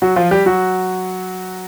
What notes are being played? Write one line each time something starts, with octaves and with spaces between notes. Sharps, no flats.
F#3 F#4
F3 F4
G3 G4
F#3 F#4